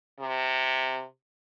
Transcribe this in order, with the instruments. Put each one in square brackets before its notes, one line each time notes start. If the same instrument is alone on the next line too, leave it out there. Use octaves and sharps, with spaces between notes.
[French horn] C3